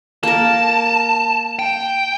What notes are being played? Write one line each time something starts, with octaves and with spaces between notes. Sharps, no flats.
A#3 A#4 A5
G5